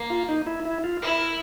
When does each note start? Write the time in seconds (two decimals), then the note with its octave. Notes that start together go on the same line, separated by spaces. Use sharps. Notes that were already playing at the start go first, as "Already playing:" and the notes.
Already playing: A#3
0.10 F4
0.29 D#4
0.47 E4
0.65 E4
0.84 F4
1.02 E4 A#4